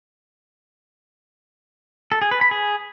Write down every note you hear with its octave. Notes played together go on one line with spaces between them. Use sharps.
A4
G#4
B4
B5
G#4